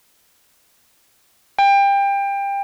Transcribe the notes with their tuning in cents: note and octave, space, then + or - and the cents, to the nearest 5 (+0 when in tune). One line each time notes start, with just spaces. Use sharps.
G5 +25